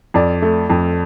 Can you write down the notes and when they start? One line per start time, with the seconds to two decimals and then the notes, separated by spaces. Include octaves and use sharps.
0.14 F2 D5
0.42 A3
0.70 F2